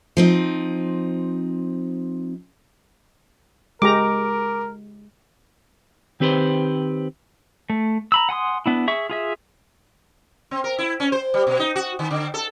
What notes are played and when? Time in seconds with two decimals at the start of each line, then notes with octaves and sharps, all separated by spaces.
0.17 F3 C4 D#4
3.82 G#3 G4 A#4 A#5 D6
6.20 D#3 C4 G4 B4 C5
7.70 A3
8.12 A#5 B5 E6
8.29 F#5 G#5 C6 D#6
8.66 B3 D4 E4
8.88 G#4 E5 C#6
9.10 F4 G#4 E5
10.51 C4
10.64 A#4
10.78 E4
11.00 C#4
11.12 C5
11.34 G3
11.47 B2
11.59 D#4
11.76 F#4
11.99 D#3
12.11 D3
12.34 A4